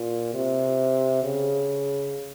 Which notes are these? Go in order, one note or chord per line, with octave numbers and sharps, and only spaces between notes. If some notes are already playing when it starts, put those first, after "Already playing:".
Already playing: A#2
C3
C#3